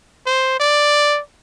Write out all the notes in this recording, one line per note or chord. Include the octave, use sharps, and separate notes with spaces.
C5
D5